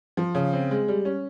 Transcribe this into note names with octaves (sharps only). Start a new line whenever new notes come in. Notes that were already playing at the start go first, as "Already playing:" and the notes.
F3
C#3
C4
G#3
G3
C#4